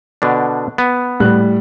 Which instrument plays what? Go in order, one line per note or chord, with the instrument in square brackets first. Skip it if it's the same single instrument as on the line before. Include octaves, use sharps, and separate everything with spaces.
[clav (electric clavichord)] B2 D3 D4
B3
[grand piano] A2 G3 F#6